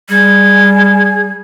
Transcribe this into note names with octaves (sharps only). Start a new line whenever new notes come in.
G3 G#4 G#6